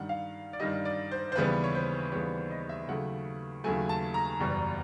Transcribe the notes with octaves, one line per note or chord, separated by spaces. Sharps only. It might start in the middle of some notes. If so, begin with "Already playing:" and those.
Already playing: G2 D#3 G3 F#5
F5
D5
G2 D#3 G3 D#5
D5
C5
C5
D#2 C#3 E3 G3 B3 B4
C#5
C5
D#2 C#3 E3 G3 B3 C#5
D#5
E5
D#2 C#3 F#3 A3 F#5
D#2 C#3 F#3 A3 G#5
A5
A#5
F#1 E2 B2 G3